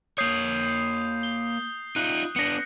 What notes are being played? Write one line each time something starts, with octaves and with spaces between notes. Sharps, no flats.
A#3 C#5 D#6 G6 C7
G7
D#4 F4 F#6
B3 D4 A#6 C#7